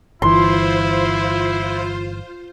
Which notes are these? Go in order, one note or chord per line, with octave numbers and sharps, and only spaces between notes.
G1 E3 E4 F4 C5 C6